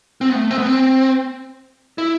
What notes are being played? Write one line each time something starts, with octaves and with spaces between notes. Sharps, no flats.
C4
B3
A3
C4
B3
C4
E4